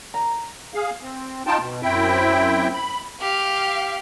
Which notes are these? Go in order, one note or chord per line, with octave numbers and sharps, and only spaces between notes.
A#5
G#4 F5
C4
D#4 F4 G5 A5
B2
F#2 C4 E4 E5 G5
B5
G4 F5